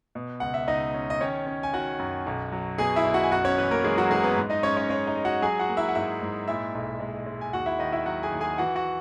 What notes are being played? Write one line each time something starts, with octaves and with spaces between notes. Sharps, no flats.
B2
C#2 F#5
E5
C#2 D#4 D#5
C#4
D#5
D#3 C#4 C#5
C#4
G#5
D#3 F#4 F#5
F#2
B1
F#3
B2 G#4 G#5
E4 E5
B1
F#4 F#5
G#5
F#2 F#4 F#5
C#4 C#5
E3 B3 B4
A#3 A#4
E3 G#3 G#4
F#3 F#4
E3 G#3 G#4
B3 B4
G#2
D#4 D#5
G#3 C#4 C#5
C#4 C#5
G#3 C#4 C#5
D#4 D#5
G#3
F#4 F#5
F#3 G#4 G#5
F#4 F#5
A#3
E4 E5
F#5
G#2 E4 E5
G#2
A#2 E4 E5
B1
G#3
G#3
G#5
D#2 F#4 F#5
E4 E5
D#3 D#4 D#5
E4 E5
F#3 F#4 F#5
G#4 G#5
D#2
G#4 G#5
E3 F#4 F#5
F#4 F#5